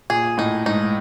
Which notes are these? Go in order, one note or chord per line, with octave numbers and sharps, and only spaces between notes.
A#2 G#4
A2 D#4
G#2 D#4